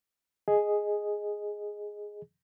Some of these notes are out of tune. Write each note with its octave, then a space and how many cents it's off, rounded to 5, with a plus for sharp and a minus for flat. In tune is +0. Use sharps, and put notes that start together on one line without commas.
G#4 +0 D#5 +0